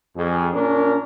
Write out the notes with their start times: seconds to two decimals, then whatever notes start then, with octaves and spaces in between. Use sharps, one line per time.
0.17 F2 G#4
0.54 A#2 C#4 D4 A#4